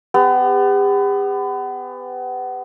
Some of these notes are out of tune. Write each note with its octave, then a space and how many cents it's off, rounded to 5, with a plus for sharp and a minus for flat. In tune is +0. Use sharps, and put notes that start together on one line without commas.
B3 +30 G4 +45